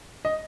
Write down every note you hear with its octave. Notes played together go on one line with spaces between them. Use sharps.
D#5